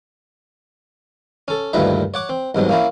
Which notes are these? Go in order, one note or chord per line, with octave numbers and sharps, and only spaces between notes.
C#4 A4
D2 G2 A#2 D#3 B4 E5
C#5 F#5 D6
C4
C2 G#2 B2 F#3
A#3 C#4 E4